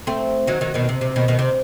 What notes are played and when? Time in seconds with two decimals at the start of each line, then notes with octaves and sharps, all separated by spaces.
0.07 A3 C4
0.47 D#3 F#3
0.61 D#3 F#3
0.74 B2 D#3
0.89 C3
1.01 C3
1.16 B2 D#3
1.28 B2 D#3
1.39 C3